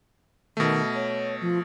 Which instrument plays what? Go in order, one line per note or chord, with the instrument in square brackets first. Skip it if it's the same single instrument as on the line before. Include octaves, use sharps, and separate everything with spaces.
[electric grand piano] B2 A3 [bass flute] D#3
[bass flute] C#5
F3